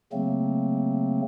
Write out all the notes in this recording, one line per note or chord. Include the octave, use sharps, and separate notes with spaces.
C#3 F#3 A3 A#3 C4